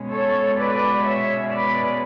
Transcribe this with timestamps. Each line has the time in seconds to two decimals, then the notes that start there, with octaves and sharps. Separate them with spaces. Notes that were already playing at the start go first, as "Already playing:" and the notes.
Already playing: B2 G#3 C#4
0.11 A4 C#5
0.58 B4 D5
1.04 C#5 E5
1.50 B4 D5